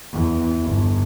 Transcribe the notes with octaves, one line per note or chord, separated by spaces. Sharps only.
E2
G1